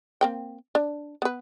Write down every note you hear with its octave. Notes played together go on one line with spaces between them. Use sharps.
A#3 C4 G5
D4
B3 B4